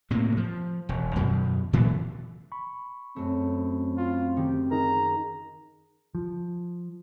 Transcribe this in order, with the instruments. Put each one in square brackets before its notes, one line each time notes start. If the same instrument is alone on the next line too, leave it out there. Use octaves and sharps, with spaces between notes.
[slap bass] A2 C3 A#3
F3
E1
F#2 B2 D#3
A#2 E3 F#3 A3
[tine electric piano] B5 C#6
[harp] F#2 A3 [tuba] C4
[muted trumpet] F4
[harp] D#3 [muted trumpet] G4
[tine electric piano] D#4 G#4 A#4 [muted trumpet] A#5
[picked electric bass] F3